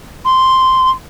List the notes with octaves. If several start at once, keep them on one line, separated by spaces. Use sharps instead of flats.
C6